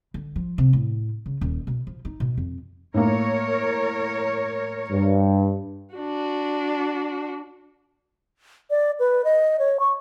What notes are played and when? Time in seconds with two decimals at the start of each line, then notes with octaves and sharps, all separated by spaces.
0.14 D3
0.36 F3
0.58 C3
0.73 A2
1.26 C#3
1.41 D#1
1.67 B2
1.87 F3
2.05 D#4
2.20 B2
2.37 F2
2.94 A2 A#3 A#4 C#5
4.91 G2
5.94 D4 F#4
8.70 D5
8.99 B4
9.24 D#5
9.59 C#5
9.80 C#6